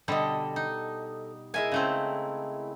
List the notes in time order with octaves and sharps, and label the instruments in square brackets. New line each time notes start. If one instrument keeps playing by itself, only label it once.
[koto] B2 D3 G3 [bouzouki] A4 D#5
[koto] D#4
[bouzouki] G#3 E4 A#4 [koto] G#5
[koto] C#3 A3 C4